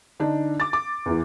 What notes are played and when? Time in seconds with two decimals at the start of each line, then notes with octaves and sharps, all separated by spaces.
0.20 D3 D4 D#4
0.60 D6 A6
0.73 D6
1.06 E2 E3